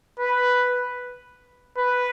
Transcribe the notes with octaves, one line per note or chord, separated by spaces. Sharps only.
B4
B4